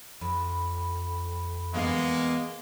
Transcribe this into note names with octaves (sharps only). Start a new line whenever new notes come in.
F2 B5
E2 G#3 A#3 B3 F5